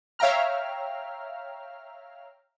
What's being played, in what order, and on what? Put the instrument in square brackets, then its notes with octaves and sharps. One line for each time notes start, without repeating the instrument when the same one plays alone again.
[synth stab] C#5 E5 F5 G5 A#5 F6